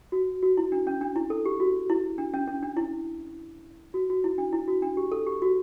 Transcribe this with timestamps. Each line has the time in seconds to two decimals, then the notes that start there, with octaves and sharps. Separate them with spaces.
0.12 F#4
0.42 F#4
0.57 E4
0.72 D4
0.87 C#4
1.01 D4
1.16 E4
1.30 A4
1.46 G4
1.60 F#4
1.90 E4
2.18 D4
2.34 C#4
2.48 C#4
2.63 D4
2.77 E4
3.94 F#4
4.10 F#4
4.24 E4
4.38 D4
4.53 E4
4.68 F#4
4.82 D4
4.97 G4
5.12 A4
5.27 G4
5.42 F#4